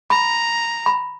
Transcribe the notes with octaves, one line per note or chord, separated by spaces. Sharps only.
A#5 B5
B5